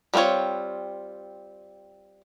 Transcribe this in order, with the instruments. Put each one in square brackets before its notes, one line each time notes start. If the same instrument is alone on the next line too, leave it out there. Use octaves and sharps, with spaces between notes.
[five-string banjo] G3 A#3 C4 F4 C#5